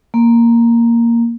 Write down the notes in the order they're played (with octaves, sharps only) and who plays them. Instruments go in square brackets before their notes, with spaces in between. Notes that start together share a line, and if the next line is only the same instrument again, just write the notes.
[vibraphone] A#3